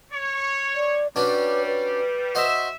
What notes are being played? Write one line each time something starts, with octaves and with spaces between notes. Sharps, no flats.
C#5
D5
G3 C#4 D4 F#4 B4
B4
F#4 C5 D#5 E5